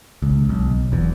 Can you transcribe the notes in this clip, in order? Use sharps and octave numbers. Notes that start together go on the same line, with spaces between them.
C#2
B1
E1 E2